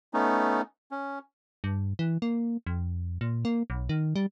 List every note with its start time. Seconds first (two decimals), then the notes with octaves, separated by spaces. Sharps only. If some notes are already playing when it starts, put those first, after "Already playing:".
0.14 A3 B3 C#4 D#4
0.91 C#4
1.64 G2
1.99 E3
2.22 A#3
2.67 F2
3.21 A#2
3.45 A#3
3.70 B1
3.89 D#3
4.16 G3